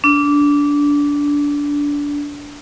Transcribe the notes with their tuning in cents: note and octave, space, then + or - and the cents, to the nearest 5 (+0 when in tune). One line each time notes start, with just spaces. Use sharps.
D4 -20